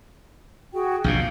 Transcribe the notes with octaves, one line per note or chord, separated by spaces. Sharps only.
F#4 G#4 G5
A#1 E2 B2 F5 G6